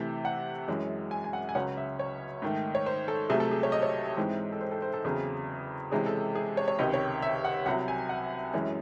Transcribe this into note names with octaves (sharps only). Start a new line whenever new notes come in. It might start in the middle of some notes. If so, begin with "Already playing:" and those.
Already playing: C3 E3 A3
F#5
F#2 E3 G#3 C#4
G#5
G#5
F#5
G#5
C#2 C#3 F#3 C#4 F#5
E5
C#5
G#2 D#3 A3
C#5
C5
A4
C2 C3 F#3 A3 G#4
A4
G#4
C#5
D#5
C#5
G#2 E3 G#3 C4
A4
C5
A4
C5
A4
E2 C#3 F#3 C4 G#4
C3 E3 G#3 C#4 G#4
A4
G#4
C#5
C#5
C#2 C3 D#3 D#5
C#5
E5
F#5
C2 C3 F#3 F#5
G#5
F#5
F#2 E3 G#3 C#4